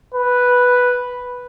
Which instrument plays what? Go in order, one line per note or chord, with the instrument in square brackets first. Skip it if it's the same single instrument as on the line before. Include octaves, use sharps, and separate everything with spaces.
[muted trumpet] B4